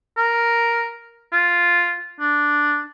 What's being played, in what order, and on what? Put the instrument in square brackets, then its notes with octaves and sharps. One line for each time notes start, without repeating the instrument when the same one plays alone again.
[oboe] A#4
F4
D4